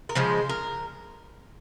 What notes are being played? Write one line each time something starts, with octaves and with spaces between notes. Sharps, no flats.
A#4
C#3 F3 G#3 C5
A#4